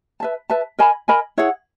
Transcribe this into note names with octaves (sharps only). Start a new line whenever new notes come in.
B4 E5 A5
B4 E5 A5
A#4 D#5 G#5 B5
A#4 D#5 G#5 B5
E4 G#4 C#5 F#5